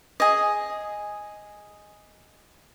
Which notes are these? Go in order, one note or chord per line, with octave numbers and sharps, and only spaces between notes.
G#4 D#5